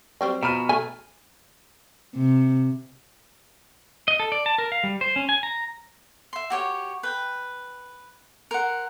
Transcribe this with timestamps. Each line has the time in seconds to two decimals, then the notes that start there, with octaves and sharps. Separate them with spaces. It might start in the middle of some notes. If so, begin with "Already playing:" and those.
0.21 F#3 G3 C4
0.43 B2 F3 A#5 B5 F6
0.69 A3 G#5
2.15 C3
4.08 D#5
4.20 A4
4.32 D5
4.46 A5
4.58 A#4
4.72 F5
4.84 G3
5.01 C5
5.16 C#4
5.29 G#5
5.43 A#5
6.33 E5 C6
6.50 F#4 G4 C#5
7.03 B4 G5
8.51 A#4 C5 F#5